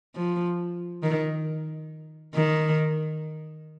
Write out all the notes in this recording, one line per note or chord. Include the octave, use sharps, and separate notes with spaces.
F3
D#3
D#3